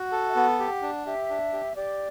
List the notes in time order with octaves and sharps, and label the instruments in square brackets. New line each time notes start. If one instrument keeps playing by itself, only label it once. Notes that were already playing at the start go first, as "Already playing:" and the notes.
Already playing: [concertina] F#4 [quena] F#5
[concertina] A4
[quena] E5
[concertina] B3 [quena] F#5
[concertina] G4
D4
[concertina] G4 [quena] E5
[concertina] D4
G4
[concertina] G4 [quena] D5